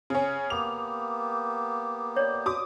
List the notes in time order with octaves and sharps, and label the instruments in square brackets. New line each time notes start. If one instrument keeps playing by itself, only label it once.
[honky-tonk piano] C#3 C#4
[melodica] A#3 B3 G4 [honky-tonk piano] F7
[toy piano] C#5 D5
[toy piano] F#4 [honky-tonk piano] D6 D#6